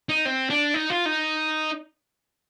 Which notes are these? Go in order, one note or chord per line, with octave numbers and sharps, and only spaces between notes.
D#4
C4
D4
D#4
F4
D#4